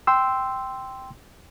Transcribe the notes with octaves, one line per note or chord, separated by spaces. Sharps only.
G5 C6 E6